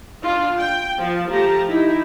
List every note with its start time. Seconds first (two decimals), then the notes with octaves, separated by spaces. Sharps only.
0.23 D4 F4
0.60 G5
0.98 F3 A5
1.29 F3 A3 G4 A5 A#5
1.68 D#4 E4 G4